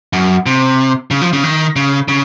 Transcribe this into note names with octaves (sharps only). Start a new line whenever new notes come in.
F#2
C3
C#3
F3
C#3
D#3
C#3
C#3